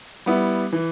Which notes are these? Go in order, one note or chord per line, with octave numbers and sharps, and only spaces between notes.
G3 B3 E4
E3